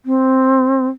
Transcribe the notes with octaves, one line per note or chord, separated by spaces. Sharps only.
C4